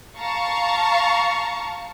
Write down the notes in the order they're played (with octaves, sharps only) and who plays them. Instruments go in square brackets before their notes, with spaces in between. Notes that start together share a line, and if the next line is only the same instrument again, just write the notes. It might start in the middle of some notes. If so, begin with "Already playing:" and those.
[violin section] F5 A5 A#5 C#6